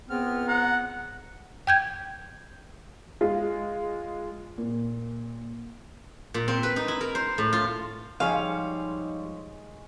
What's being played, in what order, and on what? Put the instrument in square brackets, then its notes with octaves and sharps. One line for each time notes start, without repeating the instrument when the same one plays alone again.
[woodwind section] C#2 B3 [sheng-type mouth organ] C4 F6
[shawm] F#5 [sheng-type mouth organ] A#5
[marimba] G5 G6 G#6
[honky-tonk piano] G#3 F4
[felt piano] A#2
[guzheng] A#2
C4
B4
D#4
E4
A#4
C5
A2
F4
[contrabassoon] G#2 [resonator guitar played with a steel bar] F3 G3 C#5 [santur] G#3 C#6 [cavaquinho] F5